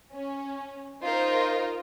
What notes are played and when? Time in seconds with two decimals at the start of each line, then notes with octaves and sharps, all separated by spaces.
0.13 C#4
1.03 D#4 F4 A#4 C5 D#5